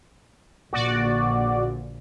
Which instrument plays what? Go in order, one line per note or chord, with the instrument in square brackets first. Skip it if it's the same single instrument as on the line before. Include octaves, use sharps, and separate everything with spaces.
[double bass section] A#1 A#2 D3 [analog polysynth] F#4 D5